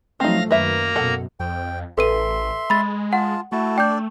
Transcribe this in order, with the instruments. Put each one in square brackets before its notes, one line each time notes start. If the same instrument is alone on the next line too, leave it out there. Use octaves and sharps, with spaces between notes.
[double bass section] F3 F#3 A3 [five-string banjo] C4 D#4 [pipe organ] F5 A#6
[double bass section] F#2 D#3 [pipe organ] A#3 A#5 [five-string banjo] B4 E5
[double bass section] F#2 B2 [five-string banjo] A4 F#5
[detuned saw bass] F2 [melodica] G5
[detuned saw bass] A1 [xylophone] A4 B4 D#7 [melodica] E5 C6
[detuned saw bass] G#3 [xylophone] B5 A6
[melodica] F4 A5 [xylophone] F#5
[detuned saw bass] A3 [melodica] E4 F#4 A5
[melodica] D4 D5 [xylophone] G5 G6